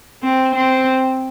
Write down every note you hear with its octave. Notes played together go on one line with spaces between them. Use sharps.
C4
C4